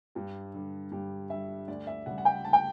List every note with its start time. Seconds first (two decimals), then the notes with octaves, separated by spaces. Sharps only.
0.15 G2 G4
0.54 D3 G3
0.92 G2 G4
1.30 D3 G3 E5
1.68 D2 D5
1.87 E5
2.06 C#3 G3 F#5
2.18 F#5
2.25 G5
2.44 D2 A5
2.53 G5